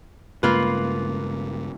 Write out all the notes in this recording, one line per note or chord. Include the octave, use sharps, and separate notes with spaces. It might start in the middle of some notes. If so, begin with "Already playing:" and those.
G2 C#3 G#3 A#3 F4 B4